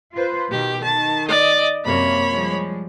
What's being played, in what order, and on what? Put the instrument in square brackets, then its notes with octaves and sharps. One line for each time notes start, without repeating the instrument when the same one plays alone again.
[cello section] F4 B4 C5
[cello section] B2 D#3 [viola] G4
[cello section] D#3 [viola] A5
[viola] D5 D#5
[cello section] F#2 C3 A#3 [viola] C#5 B5
[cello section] F3 G3 G#3